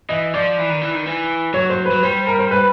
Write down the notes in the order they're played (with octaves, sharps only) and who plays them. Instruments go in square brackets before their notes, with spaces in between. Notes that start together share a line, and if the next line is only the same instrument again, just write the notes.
[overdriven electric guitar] E3 [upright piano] D#5
[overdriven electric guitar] F3 [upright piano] D5
[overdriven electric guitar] E3
D#3
E3
D#3
E3
[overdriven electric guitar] F#3 [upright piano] C#5
[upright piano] C5
[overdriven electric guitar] F#3 [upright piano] B4
[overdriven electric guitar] G3 [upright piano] C5
[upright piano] A#4
C5
B4